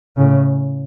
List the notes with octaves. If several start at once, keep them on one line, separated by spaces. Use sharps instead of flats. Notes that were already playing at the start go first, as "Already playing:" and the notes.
A2 C#3